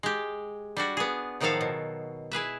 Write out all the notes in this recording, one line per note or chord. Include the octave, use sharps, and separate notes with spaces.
G#3 G4
G3 D4 F#4
B3 G#4
A2 D#3 F3 F#3 A4 F5
B2
E4 G#4 B4 E5